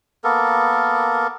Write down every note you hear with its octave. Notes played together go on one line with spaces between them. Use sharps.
A#3 B3 A4 A#4